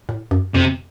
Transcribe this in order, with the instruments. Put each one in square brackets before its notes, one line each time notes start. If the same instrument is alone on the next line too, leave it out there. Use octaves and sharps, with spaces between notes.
[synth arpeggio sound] A2
F#2
[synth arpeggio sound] F2 [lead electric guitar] C3